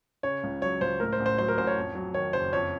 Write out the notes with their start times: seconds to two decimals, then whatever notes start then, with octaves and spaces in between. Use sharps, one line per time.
0.23 C#3 C#5
0.43 C#2
0.62 F#3 C#5
0.81 C#2 C5
1.00 A2 A#4
1.13 C5
1.20 A1
1.26 C5
1.38 F#3 C5
1.48 A#4
1.57 A1 C5
1.67 C#5
1.76 F2
1.95 F#3
2.14 D#3 C#5
2.33 F#1 C5
2.52 F2 C#5